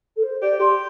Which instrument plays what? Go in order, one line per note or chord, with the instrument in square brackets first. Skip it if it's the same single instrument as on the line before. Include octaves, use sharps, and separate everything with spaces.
[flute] A4
C5
[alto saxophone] G4 [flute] D5
[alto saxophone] G4 [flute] C6